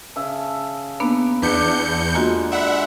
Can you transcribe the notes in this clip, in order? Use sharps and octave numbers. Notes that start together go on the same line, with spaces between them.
C#3 E5 A5
A#3 B3 D4 B4
E2 D4 B4 D5 F#5 G6 C#7
D3 G#3 A#3 F4 F#4
D5 E5 F#5 B5